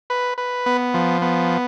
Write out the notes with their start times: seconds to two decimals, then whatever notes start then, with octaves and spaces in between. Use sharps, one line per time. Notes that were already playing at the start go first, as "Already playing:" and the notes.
0.10 B4
0.38 B4
0.66 B3
0.94 F3
1.22 B3